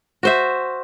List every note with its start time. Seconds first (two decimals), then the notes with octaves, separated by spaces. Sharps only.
0.23 F#4 C5 E5